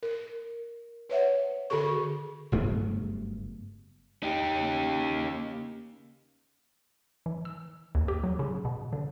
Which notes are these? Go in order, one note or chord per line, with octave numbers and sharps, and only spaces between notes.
A#4
B4 C#5 E5 F#5
D3 F#4 G#4 A4 C#6
F#1 G2 A3 B3
D#4 G4
C#3 A#3
E3
E6
D#2
G4
F#3
C#3
B2
D3